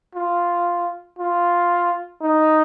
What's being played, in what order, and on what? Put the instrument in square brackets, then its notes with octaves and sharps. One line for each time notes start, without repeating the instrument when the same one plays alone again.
[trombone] F4
F4
D#4